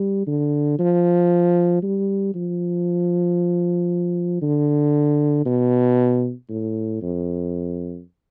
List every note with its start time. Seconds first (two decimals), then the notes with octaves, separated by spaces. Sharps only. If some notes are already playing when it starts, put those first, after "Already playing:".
Already playing: G3
0.27 D3
0.79 F3
1.82 G3
2.34 F3
4.41 D3
5.45 B2
6.49 A2
7.01 F2